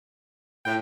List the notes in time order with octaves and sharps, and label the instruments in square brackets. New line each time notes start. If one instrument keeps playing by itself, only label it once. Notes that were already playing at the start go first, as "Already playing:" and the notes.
[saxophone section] A2 [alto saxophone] G5